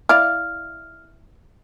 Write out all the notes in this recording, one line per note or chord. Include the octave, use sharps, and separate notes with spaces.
E4 D5 F5 F6